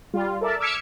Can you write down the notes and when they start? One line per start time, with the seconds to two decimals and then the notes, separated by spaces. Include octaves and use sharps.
0.14 G3 F4
0.41 A4 A#4 D5 E5 A5
0.60 D6 E6 F6 G#6 B6 C#7